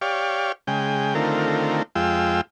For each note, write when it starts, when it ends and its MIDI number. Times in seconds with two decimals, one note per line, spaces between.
0.01 0.52 67
0.01 0.52 73
0.01 0.52 74
0.01 0.52 77
0.67 1.14 49
0.67 1.14 56
0.67 1.14 79
1.15 1.83 50
1.15 1.83 51
1.15 1.83 57
1.15 1.83 60
1.15 1.83 65
1.15 1.83 70
1.95 2.41 41
1.95 2.41 56
1.95 2.41 65
1.95 2.41 79
1.95 2.41 88